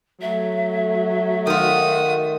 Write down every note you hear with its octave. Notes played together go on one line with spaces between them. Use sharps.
F#3 A3 E5
D#3 F4 F#4 D#6